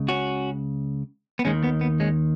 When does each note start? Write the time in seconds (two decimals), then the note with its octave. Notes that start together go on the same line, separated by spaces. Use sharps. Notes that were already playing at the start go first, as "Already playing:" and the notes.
Already playing: C#2 C#3
0.08 C#4 F#4
1.39 B3
1.45 D#2 D#3 G#3 C#4
1.63 B3
1.81 B3
2.00 G#3 C#4